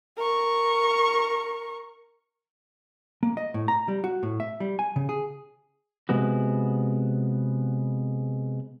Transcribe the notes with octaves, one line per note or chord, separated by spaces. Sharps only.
A#4 C#6
A#3
D#5
A2
A#5
G3
F#4
A2
E5
G3
G#5
C#3
G#4
C3 G#3 B3 F#4